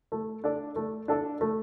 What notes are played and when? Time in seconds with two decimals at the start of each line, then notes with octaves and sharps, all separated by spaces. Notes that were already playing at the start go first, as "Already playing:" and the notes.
0.12 A3
0.44 D4 A4 D5
0.76 A3
1.08 D4 A4 D5
1.41 A3